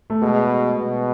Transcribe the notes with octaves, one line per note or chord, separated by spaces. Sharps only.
A3
B2 G#3
B2